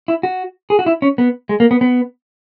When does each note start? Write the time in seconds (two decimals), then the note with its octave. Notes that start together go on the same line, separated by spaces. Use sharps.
0.08 E4
0.23 F#4
0.70 G#4
0.79 F#4
0.86 E4
1.02 C#4
1.18 B3
1.49 G#3
1.60 A#3
1.71 B3
1.81 B3